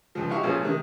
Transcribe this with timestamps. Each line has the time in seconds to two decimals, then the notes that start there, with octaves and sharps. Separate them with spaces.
0.15 C#2 F3
0.29 D#4 E4 F#4 G4 F5 C#6
0.43 B1 A#2 F3 C#4 G#4
0.63 C3 D#3